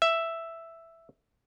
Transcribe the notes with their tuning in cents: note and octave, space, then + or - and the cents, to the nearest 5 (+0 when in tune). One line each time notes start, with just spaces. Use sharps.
E5 +5